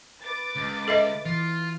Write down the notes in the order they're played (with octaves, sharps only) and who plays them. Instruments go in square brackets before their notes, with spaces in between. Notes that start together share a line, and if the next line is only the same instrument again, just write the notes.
[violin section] B4 D6 A6
[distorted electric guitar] C#2
[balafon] A4 D#5 E5
[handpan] E3 [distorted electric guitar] F4